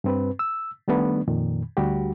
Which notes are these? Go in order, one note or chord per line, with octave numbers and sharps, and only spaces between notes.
G2 C4 B4
E6
D#3 G3 A3 B3 D4
F2 A#2 D#3
D2 G3 F#4 G4